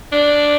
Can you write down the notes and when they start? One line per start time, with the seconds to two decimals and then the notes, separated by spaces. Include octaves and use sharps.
0.12 D4